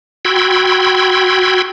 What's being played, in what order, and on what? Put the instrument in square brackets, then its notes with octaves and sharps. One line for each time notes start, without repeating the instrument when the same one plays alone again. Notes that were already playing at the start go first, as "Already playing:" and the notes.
[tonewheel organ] F#4 G5 B5 C6 E6 G#6